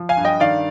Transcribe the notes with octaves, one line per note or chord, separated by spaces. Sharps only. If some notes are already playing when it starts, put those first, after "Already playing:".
Already playing: F3
F5 G#5
G2
D#5 G5
D#3 D5 F5